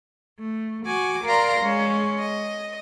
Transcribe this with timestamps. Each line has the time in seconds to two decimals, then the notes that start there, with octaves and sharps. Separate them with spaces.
0.38 A3
0.85 F#4 G#5 D6
1.25 A#4 D5 F5 A#5 C6
1.60 G#3 C#4
2.19 D#5